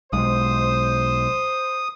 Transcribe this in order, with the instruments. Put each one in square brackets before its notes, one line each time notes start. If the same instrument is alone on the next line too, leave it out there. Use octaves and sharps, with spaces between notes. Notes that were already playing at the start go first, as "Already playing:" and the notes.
[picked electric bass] B1 G#3 [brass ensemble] C5 [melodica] D#6